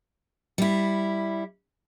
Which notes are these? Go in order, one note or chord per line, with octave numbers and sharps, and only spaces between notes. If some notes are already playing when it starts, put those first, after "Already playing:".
G3 E4